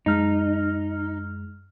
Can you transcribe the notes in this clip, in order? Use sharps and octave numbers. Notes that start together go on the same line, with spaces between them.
F#2 G#3 D#4 F6